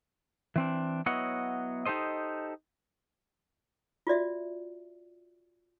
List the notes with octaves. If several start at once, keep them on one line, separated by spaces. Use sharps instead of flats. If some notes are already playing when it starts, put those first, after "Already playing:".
E3 C4 D4
F#3 B3 E4 C#5 D#5 F#5
D#4 G4 A4 C5 D#5
F4 F#4 D5 E5